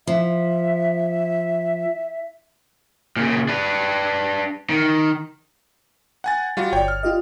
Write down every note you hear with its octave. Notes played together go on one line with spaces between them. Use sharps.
F3 E5
A#2 C#3
D4 B4
D#3
F#5 G#5 A6
G3 F4 F#4
G1 C#5 D5 G5
F6
F4 G4 D#5